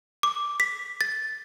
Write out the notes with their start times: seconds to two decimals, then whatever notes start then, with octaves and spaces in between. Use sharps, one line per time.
0.23 D6
0.60 B6
1.01 A6